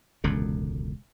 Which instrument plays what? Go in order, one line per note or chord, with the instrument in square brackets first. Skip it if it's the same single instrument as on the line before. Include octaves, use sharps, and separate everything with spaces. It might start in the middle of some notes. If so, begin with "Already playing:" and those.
[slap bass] E1 C#2 F#2 D3